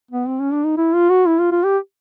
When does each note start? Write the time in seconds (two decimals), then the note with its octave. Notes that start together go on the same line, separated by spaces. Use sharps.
0.11 B3
0.27 C4
0.40 C#4
0.52 D4
0.65 D#4
0.77 E4
0.94 F4
1.10 F#4
1.27 E4
1.40 F4
1.52 F4
1.64 G4